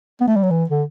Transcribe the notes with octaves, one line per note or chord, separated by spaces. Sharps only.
B3
A3
G3
F#3
E3
D3